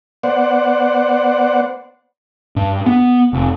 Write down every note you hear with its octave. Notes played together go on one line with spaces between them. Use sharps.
B3 C5 D5 F#5
G2
B3
F1